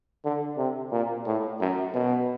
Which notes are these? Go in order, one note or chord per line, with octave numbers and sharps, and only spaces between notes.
D3
C3
A#2
A2
F#2
B2